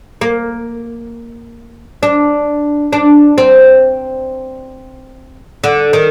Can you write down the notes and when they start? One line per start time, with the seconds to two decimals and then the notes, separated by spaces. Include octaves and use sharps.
0.21 A#3
2.03 D4
2.93 D4
3.38 C4
5.64 D3
5.93 D#3